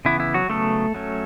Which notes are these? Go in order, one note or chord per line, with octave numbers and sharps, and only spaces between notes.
C#3 E3 B3 E4
E4
F#3 F#4
C#3 F#3 A3 B3 A4
F#3 A3 C#4